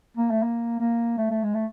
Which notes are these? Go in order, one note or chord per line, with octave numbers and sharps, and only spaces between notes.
A#3
A3
A#3
A#3
A3
A3
G#3
A3